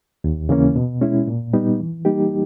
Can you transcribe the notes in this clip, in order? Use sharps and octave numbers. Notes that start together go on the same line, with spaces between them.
D#2
C#3 E3 A#3 C#4
B2
G#3 C#4 E4
A#2
G3 B3 D#4
E3
G3 A#3 D#4 G4